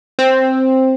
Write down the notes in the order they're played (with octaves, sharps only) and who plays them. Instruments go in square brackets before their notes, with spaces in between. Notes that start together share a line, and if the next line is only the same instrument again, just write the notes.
[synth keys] C4